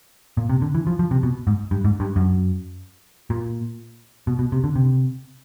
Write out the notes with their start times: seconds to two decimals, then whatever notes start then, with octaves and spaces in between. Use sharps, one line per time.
0.37 A#2
0.49 C3
0.62 D3
0.75 E3
0.87 F3
0.99 F3
1.11 C3
1.23 B2
1.47 G#2
1.71 G2
1.84 G#2
2.00 G2
2.16 F#2
3.30 A#2
4.27 B2
4.39 B2
4.52 C3
4.64 D3
4.75 C3